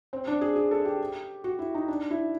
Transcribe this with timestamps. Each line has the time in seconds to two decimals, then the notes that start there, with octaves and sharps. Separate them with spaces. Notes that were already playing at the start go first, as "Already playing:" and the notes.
0.13 C4
0.27 D4
0.41 G#4
0.56 G#4
0.71 A4
0.85 G4
1.44 F#4
1.59 E4
1.75 D#4
1.88 D4
2.11 E4